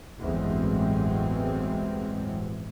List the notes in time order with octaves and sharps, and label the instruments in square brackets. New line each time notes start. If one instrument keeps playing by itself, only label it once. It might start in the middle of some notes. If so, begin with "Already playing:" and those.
[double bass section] A1 E2 G2 F#3 G#3 C4